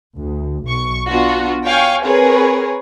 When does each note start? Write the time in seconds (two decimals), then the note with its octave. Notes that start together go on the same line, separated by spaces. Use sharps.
0.16 D2
0.66 B1 C#6
1.08 B3 D4 F4 F#4
1.65 C#5 F5 G5 G#5 C#6
2.03 C4 G#4 A#4 B4 C#5